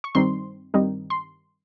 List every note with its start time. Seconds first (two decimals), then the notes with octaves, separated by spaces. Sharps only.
0.04 C#6
0.15 G2 D#3 G3 C4 D#4 C6
0.74 G2 D#3 G3 C4 D#4
1.10 C6